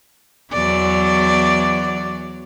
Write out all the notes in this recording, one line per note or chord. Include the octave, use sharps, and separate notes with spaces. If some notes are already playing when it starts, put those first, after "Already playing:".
E2 F#3 D5